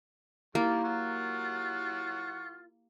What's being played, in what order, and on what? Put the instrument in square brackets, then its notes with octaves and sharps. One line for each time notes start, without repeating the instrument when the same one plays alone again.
[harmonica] D#3 G3 [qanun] A#3 [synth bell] E4 G4 [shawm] F4
[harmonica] F#3 F#5 C#6 [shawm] F4